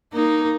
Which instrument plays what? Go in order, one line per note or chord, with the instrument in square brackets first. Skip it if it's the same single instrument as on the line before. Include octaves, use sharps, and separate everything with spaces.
[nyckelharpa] A#3 [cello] D#4